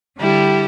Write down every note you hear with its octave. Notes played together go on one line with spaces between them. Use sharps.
D3 G3 E4 G4